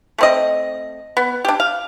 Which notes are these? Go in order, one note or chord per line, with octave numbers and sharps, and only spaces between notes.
A3 C4 D#5
B3
D4 G4
F5